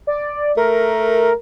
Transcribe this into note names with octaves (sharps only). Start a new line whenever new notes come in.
D5
A3 A#4